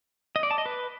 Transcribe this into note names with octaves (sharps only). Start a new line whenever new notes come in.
D#5
D5
A5
D#5
B4